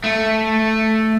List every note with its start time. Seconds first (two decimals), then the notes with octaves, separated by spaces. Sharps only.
0.04 A3